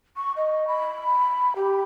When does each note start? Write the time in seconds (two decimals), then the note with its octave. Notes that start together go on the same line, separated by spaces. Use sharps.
0.17 C#6
0.36 D#5
0.68 B5
1.56 G4